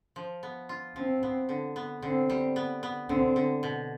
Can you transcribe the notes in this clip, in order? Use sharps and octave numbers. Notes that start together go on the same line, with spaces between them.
F3
B3
F4
F3 C4
B3
D3
B3
D3 C4
G3
B3
B3
D3 C4
D3
B2